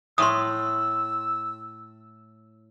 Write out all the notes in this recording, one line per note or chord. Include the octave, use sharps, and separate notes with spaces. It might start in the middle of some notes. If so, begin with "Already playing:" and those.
A2 C6 C#6 D#6 E6